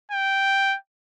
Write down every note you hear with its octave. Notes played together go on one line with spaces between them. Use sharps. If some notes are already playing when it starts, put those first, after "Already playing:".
G5